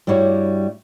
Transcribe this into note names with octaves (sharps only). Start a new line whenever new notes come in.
G2 G3 E4 F#4 C#5